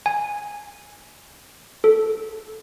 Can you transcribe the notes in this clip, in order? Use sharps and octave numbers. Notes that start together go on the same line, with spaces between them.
G#5
A4